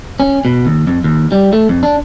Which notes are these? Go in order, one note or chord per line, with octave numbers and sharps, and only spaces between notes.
C#4
B2
D#2
F2
D#2
G3
A3
F2
D4